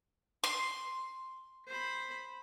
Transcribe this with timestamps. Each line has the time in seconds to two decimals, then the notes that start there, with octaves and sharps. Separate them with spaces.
0.44 C6
1.67 C5 B5